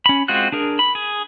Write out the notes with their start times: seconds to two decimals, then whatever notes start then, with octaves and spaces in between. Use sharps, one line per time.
0.06 C#4 B5
0.28 G#3 C4 F4 F#4 F#6
0.52 D4 G#4 A#4
0.79 B5
0.95 G#4